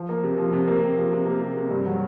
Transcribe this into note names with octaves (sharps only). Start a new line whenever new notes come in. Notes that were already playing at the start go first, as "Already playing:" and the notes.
Already playing: F3
A#3
C3
F3
C3
A#3
C3
F3
C3
A#3
C3
C3
G2
F#3